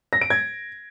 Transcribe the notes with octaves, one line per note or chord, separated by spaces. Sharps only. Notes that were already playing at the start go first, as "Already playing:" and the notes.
A#6
D7
G#6